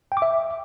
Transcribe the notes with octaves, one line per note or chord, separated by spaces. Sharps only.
G5
D6
E5